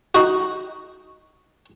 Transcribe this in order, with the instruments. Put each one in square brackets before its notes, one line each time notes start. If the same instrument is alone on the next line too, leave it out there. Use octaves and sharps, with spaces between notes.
[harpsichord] D#4 F#4